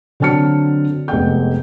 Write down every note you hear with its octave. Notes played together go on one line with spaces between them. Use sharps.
D3 F#3 C4 A5 F6 C#7
F1 G#3 B3 G5 G6